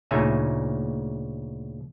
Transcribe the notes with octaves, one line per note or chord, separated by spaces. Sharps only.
D2 A#2 C#3 D#4 E5 G#5